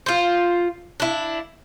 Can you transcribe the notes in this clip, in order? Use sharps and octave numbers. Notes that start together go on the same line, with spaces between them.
F4 C5
D4 E4